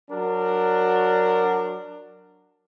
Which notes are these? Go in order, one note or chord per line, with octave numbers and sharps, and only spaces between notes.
F#3 D4 F#4 A#4